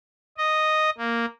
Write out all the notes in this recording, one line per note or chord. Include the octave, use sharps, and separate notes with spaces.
D#5
A#3